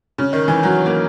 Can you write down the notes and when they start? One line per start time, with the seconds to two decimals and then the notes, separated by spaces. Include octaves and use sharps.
0.18 C#3
0.33 D#3
0.48 E3
0.63 F#3
0.86 A#3